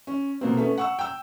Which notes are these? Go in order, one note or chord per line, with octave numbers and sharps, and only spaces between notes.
C#4
B2 A#3 C4
A3 B3 C#4
F#5 C#6 E6
G5 E6